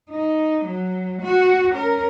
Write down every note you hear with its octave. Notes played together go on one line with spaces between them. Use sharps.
D#4
F#3
F#4
C#4 A#4